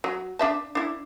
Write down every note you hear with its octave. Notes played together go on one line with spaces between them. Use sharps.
F#3
D4 E5 A5
D4 E4